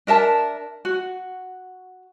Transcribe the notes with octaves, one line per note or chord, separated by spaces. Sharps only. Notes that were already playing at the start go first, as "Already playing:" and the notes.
D4 A#4 E5 A5
F#4